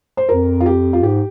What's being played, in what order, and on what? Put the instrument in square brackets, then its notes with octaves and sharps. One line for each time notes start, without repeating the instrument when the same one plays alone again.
[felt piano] C5
[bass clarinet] F2 [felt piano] A#4
[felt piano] F4
G4
F4
[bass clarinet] G#2 [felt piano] G4